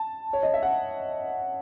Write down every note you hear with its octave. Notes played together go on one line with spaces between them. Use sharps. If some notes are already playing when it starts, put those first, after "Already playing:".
Already playing: A5
C#5
D#5
E5
F#5